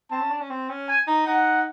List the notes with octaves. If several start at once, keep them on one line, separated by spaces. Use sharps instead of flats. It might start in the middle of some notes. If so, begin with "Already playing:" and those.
C4 A5
C#4
D4
C#4
C4
C#4
G#5
D#4
D#4 F#5